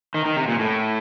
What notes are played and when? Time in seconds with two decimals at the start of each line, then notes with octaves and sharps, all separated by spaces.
0.14 D#3
0.26 D#3
0.37 C3
0.48 A#2
0.59 A2